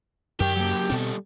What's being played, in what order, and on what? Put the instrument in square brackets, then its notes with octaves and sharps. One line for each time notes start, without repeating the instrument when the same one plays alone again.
[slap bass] F#2 [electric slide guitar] G4 [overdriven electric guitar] A#4 G5
[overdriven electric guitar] F#3 A#3
[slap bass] B2 C4 [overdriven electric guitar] G3 A4